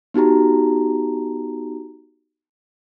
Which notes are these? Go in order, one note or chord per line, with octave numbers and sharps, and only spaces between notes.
B3 D#4 F#4 G4 A#5